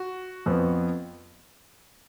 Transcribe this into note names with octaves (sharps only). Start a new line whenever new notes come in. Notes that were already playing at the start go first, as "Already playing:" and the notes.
Already playing: F#4
F2 F3 B3